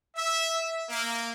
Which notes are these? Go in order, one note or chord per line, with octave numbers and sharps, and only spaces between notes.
E5
A#3